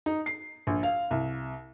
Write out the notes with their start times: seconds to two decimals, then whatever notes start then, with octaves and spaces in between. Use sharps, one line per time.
0.06 D#4
0.26 C7
0.67 A#1
0.83 F5
1.11 C2